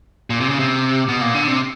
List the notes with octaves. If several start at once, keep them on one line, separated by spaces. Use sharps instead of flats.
A#2
C3
C#3
C3
B2
A#2
D3
C3